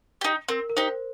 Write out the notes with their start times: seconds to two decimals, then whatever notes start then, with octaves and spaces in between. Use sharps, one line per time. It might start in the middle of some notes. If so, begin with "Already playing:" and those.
0.21 D#4 G4
0.48 C4 A#4
0.69 A#4
0.77 D#4 G4 C5